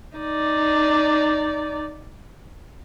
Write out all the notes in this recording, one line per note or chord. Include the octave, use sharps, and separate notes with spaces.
D#4 D5